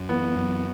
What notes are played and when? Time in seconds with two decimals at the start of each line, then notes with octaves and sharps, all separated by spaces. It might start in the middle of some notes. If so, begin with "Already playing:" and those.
Already playing: F#2
0.09 E3 B3
0.36 F#2